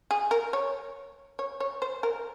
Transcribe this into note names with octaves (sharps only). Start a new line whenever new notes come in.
G#4
A#4
C#5
C#5
C#5
C5
A#4